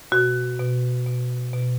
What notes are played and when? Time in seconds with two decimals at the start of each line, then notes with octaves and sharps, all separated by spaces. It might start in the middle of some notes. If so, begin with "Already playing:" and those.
0.12 B2 F#4
0.59 B2
1.07 B2
1.54 B2